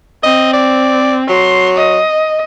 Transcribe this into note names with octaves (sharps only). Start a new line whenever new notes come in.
C4 D#5
D5
F#3 C6
D#5